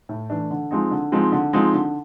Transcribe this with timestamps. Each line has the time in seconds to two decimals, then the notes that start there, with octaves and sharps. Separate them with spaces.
0.09 A2
0.30 E3 A3 D4
0.51 D3
0.71 F3 G#3 C4 D#4
0.91 D3
1.12 F3 G#3 C4 D#4
1.32 D3
1.53 F3 G#3 C4 D#4
1.73 D3